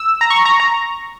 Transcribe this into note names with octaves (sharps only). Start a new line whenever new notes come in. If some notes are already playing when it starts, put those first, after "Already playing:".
Already playing: E6
A#5
C#6
A#5
A#5